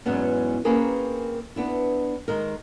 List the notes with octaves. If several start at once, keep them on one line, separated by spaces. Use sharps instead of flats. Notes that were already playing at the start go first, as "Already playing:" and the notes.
E2 G#2 F#3 B3 C#4
A#3 C4 C#4 G#4 A#4 B4
B3 D4 E4
D#3 G#3 A#4